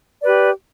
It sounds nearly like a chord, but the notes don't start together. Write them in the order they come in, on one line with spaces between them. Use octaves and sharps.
D5 B4 G4